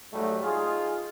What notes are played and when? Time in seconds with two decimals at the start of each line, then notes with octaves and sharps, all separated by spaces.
0.13 G#2 F#3 G3 A3
0.43 D#4 F4 G#4